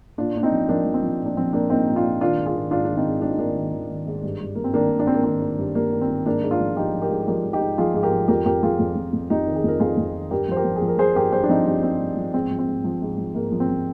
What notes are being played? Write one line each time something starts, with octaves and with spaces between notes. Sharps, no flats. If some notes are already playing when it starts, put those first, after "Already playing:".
A#2 D4 F4
A#2 D4
C4 D#4
F3
F3 A#3 D4
F3
C4
F3
A#2
D4
F3 C4
A#2 A#3 D4
A#2 C4 D#4
A#2
D4 F4
A#2
D#3 D4 F4
G#2
F4 G#4
D#3
G#2 D4 F4
D#3 D4
C4 D#4
G#2
G#2 D4
D#4
D#3 A#3 D4
D#3
D#3
D#3
G#2
G2
G2
G2 A#3
C4
D#3 A#3 D4
D#3
D4
D#3 C4
A#3
D#3 C4
D#3
G2
G2 A#3
D#3
C4
D#3
G#2 A#3 D4
G#2
D4 F4
F3
F3 D#4 G4
F3
G4 A#4
G#2
F3 G4 A#4
F3
D#4 G4
G#2
F3 F4 G#4
G#2
G4 A#4
F3
F2 G4 A#4
F2 G4 A#4
F2 F4 G#4
F2
F2
F2
F2 D#4 G4
D#3
G#4
F2 A#4
F2 F4 G#4
F2
D#3
G2 G4 A#4
F3 C5
G4 A#4
F3
G#4
F3
A#4
F3 G#4 C5
G2 G4 A#4
G2 G#4 C5
D4
F3 C4 D#4
G2 C4
G2 C4
G2
F3
G#2 C4
F3
C4
G#2
F3
G#2
F3
G#2 A#3
F3
C4
F3